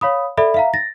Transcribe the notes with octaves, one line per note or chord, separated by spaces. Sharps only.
C#5 F5 B5 D#6
A4 D5 E5 B5
E5 F5 A#5
A6 A#6